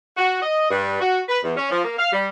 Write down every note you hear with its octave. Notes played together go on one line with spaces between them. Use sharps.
F#4
D#5
G2
F#4
B4
E2
C#4
F3
A#3
F5
G3